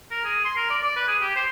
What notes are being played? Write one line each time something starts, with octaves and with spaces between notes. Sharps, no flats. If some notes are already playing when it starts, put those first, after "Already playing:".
A#4
G#4
C6
A#4
D5
D5
B4
G#4
G4
C5